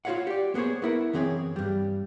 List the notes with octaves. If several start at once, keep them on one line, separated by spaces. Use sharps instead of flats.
F4 F#4 B4 C#5 F5 F#5
G4 D5
A#3 B3 G#4 C5 C#5
B3 E4 A#4
F#2 E3 C4 G#4 C#5
G2 G3